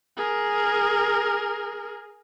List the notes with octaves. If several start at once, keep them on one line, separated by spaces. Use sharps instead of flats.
G#4 A#4